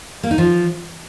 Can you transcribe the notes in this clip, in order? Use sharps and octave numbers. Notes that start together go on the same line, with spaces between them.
A#3
D#4
F3